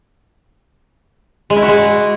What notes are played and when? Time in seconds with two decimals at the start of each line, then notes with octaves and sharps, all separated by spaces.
1.50 G#3
1.56 E4
1.62 F#4
1.68 G#3